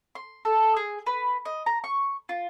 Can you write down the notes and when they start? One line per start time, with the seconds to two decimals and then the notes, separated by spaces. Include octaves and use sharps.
0.15 C6
0.45 A4
0.77 G#4
1.06 B4
1.45 D#5
1.66 A#5
1.84 C#6
2.29 F4